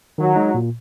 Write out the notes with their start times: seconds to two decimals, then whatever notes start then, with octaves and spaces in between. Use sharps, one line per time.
0.18 D#3 F#3
0.36 G#3 D#4
0.54 A#2